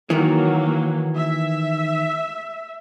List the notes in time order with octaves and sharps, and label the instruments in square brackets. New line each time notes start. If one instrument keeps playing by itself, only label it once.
[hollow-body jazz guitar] D#3 E3 [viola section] F#3 A#3
[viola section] E5